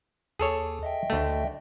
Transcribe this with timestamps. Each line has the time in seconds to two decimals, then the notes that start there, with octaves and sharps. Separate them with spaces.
0.40 D#2 G#4 A4 C#5
0.83 D#5 E5 G5
1.10 D2 A3